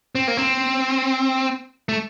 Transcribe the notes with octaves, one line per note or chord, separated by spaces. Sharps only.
C4
A#3
C4
A3